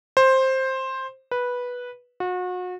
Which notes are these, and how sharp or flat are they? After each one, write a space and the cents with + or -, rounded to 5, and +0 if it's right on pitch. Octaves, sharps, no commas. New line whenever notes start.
C5 +10
B4 -10
F#4 -35